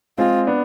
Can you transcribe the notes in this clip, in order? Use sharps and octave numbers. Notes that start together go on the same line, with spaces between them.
G#3 C4 F4
B3 D4